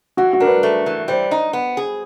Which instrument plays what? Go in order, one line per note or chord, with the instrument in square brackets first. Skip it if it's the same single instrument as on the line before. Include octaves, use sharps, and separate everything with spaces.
[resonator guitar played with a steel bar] E3 [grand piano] F#4
[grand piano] F#4
[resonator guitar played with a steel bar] D4 [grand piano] A#4
[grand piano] B4
[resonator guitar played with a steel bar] A3
E3
[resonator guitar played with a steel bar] G3 [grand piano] C5
[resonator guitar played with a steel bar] D#4
B3
G#4